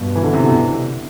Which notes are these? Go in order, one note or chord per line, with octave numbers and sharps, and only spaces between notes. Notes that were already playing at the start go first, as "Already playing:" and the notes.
Already playing: G2 B2
E3
D3
C3
B2